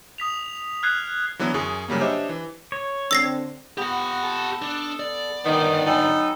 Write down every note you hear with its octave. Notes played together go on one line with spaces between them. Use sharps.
D#6 B6 F7
F6 F#6 G#6 C7
D3 E3 F#3 B3
F#2 G#4 C#6
C#3 F#3 G3 A#3
D4 G4 C5 C#5 D#5 E5
E3
C#5
D3 C4 E6 A#6 C7
B3 G4 F#5
A4
D4
D5
D3 D#3 B3
F#3 D#4 A4 G5 G#5 B5